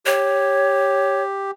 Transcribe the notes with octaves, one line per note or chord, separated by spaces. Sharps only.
G4 C#5